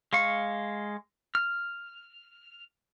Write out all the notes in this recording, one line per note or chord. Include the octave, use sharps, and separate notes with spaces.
G#3 F5 C#6
F6